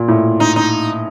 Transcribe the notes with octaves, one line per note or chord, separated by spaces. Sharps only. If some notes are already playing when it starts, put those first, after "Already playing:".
Already playing: A#2
A2
D#4
D#4